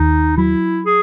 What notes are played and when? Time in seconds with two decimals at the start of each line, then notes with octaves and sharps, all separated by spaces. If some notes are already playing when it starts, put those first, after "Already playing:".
Already playing: D#2 D#4
0.38 F#3 E4
0.86 G#4